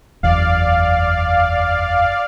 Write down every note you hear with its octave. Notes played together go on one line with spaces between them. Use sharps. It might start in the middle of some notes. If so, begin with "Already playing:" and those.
F#1 E2 D5 F5